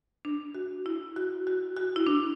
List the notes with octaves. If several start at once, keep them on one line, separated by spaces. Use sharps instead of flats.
D4
F#4
E4
F#4
F#4
F#4
E4
D4